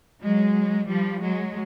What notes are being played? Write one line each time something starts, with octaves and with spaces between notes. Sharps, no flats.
F#3 G#3
F3 G3
F#3 G#3